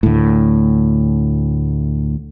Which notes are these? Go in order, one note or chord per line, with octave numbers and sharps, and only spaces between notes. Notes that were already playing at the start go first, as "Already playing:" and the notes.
D2 A2